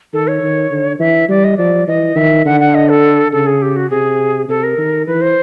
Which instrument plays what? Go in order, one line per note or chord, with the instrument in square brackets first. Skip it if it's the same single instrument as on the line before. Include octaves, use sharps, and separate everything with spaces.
[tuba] D#3 [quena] A4
[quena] C#5
[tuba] D#3
D3
[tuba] E3 [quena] E5
[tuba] G3 [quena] D5
[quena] D#5
[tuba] F3 [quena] D5
[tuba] E3 [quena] D#5
[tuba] D#3 [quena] E5
[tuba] D3 [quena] F#5
[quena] F#5
D#5
A4
[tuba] C#3 [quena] A4
[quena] G#4
G4
F#4
[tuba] C3 [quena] G#4
[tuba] C3 [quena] A4
[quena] A#4
[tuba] D#3
[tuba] E3 [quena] B4
[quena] C5